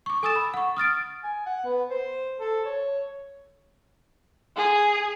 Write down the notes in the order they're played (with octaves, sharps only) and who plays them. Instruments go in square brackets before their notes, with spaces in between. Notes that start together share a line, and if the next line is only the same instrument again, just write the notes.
[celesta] C#6 D6
A4 G#5 D#6 E6 A6 E7
B5
F#5 C#6
D#6 F6 A6 D7
[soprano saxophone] G#5
F#5
B3
C5
A4
C#5
[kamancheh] G#4